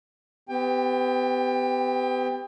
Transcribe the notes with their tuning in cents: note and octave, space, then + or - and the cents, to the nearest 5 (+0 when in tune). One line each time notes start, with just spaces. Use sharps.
B3 +40 G4 +0 G5 +30